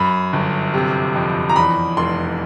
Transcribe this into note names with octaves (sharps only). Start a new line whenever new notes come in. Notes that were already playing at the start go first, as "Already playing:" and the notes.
Already playing: F#2 B5
G1
C3
F2
A#5
E2 B5
F1 C6